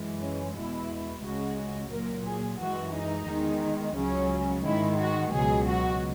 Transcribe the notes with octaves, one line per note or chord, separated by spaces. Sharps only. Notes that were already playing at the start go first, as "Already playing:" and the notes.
Already playing: F#2 E3 G#3
C#4
E2 B2 G#3 E4
C#2 C#3 G#3 F#4
A#2 F#3 A#4
G#4
F#2 E3 G#3 F#4
D#4
E2 D#3 G#3
C#2 C#3 F#3 C#4
G#2 D#3 G#3 E4
F#4
C#2 B2 F#3 G#4
F#4